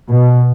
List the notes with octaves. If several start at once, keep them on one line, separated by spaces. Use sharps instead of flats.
B2